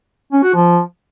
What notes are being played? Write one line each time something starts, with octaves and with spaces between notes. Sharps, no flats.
C#4
F#4
F3